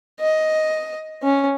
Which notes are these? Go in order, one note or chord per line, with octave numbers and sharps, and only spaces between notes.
D#5
C#4